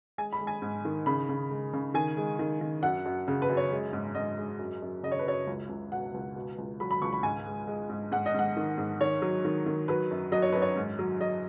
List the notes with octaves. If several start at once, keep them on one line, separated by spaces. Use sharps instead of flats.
G#3 G#5
B5
G#3
G#5
G#2
D#3
C#3 B5
C#3
G#3
C#3
D#3 G#5
G#3
D#3
D#3
F#2 F#5
F#2
C#3
B4
F#2
C#5
G#3
G#2
G#2 D#5
G#3
F#2
F#2
C#3 D#5
C#5
B4
F#2 C#5
C#2
C#2
B2 F#5
C#2
B2
C#2
F#3 B5
B5
C#2 C#6
B5
G#2 G#5
G#3
G#3
G#2
G#2 F#5
D#5
G#2 F#5
D#3
G#2
D#3 C#5
F#3
D#3
D#3
F#3 B4
F#2
F#3 D#5
C#5
F#2 B4
C#5
G#2
F#3
F#3 D#5